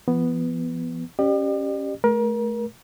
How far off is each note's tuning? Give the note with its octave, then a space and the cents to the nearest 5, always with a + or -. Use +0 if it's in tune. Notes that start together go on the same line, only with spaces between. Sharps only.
F3 -45 B3 +0
C#4 -5 G4 +0 D5 +45
A3 -25 A#4 +30